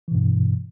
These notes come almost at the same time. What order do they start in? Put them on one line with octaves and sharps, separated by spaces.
E3 B2 G2